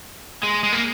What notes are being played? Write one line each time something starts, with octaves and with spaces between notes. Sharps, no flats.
G#3
G#3
A#3